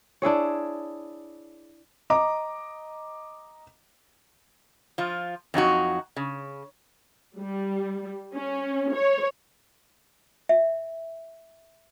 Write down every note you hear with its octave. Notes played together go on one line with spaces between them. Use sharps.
D4 E4 G#4 C#5
D#5 A#5 D6
F3 F4
F2 F#3 D#4 F#4
C#3
G3
C#4
C#5
E5